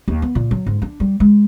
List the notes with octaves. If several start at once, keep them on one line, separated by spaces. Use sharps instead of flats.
D#2
B3
A#2
F#3
G#2
D4
G3
G#3